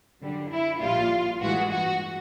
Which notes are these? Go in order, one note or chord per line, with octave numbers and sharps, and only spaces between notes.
F#2 D3 G3
E4
A#1 A#2 G3 F4
A1 G2 E3 G#3 F#4
F#4